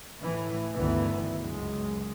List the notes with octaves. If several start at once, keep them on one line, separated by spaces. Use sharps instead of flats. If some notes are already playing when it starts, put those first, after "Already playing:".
A2 E3
G1 D2 D#3 E3 A3 B3
C#2 F#2 G#3